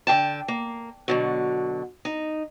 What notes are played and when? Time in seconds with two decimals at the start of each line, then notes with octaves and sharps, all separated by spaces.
0.07 D3 G#4 G5 A5
0.48 A#3
1.08 B2 D3 F#3
2.05 D#4